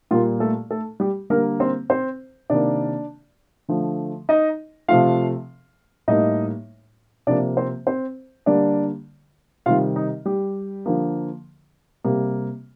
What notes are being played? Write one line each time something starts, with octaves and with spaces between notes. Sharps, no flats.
A#2 G3 A#3 F4
A3 A4
A3 A4
G3 G4
D3 G3 A#3 A#4
C4 C5
C4 C5
C3 D#3 A#3 D4 D5
D3 F3 A3
D#4 D#5
C3 F3 A3 F4 F5
A2 G3 A#3 D#4 D#5
C3 F3 A#3 D4 D5
C4 C5
C4 C5
D3 G3 A#3 D4 D5
C3 D#3 G3 F4 F5
D#4 D#5
G3 G4
D3 F3 A#3
C3 G3 A#3